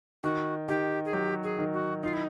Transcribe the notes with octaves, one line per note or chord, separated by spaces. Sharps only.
D#3 F#4
D#3 G4
G#4
F#3 G4
G#4
D#3
F#4
D#4 F4
E4